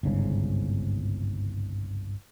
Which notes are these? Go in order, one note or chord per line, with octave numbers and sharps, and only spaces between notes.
G1 C2 G#2 C#3